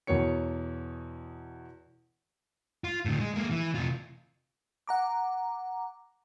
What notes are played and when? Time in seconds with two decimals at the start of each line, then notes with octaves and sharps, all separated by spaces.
0.07 E2 B2 A#4 C#5 C#7
2.84 F4
3.05 A2 D3
3.20 G#3
3.34 G#3 A#3
3.51 E3
3.75 C3 F4
4.88 F#5 A#5 D6